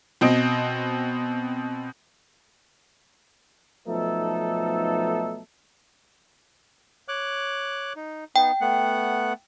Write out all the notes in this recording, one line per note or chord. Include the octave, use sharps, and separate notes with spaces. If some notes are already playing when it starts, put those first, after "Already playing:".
B2 C4 D#5 D7
B1 F3 A3 B3 D#4 A4
C#5 D6 F#6
D#4
B3 D#4 G5
A3 B3 F#5